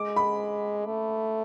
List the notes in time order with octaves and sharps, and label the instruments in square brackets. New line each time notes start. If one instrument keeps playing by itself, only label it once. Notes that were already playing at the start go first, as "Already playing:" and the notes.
Already playing: [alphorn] G#3 [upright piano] D6
[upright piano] B5
[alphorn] A3